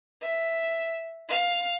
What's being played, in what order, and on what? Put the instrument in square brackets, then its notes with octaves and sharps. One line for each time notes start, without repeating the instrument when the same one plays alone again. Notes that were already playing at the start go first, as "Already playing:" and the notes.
[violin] E5
F5